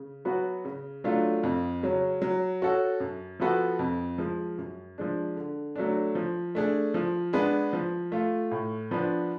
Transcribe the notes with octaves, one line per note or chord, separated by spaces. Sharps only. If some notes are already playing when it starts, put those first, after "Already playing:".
Already playing: C#3
F#3 B3 F#4
C#3
F#3 A3 D4 F4
F2
C#3 F#3 C#4
F#3
C#4 F#4 A4
F#2
F3 B3 F#4 A4
F2
F3 G#3
F#2
F3 G#3 D4
D3
F#3 A3 D4
F3
A3 D4 G#4
F3
G#3 B3 D4 G#4
F3
A3 F4
A2
F3 B3 D4